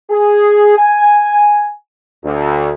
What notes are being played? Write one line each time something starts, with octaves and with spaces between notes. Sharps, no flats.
G#4
G#5
D2